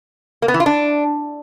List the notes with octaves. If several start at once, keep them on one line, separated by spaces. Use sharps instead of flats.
A#3
B3
E3
F4
D4